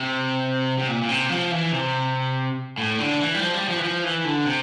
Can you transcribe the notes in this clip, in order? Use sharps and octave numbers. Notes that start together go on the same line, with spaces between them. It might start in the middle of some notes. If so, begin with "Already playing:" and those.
Already playing: C3
C3
A#2
A#2
C3
F3
E3
C3
A2
D3
E3
G3
F3
G3
F3
E3
F3
E3
D3
C3